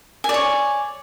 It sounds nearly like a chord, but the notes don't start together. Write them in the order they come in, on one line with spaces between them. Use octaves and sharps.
G#5 D5 C#5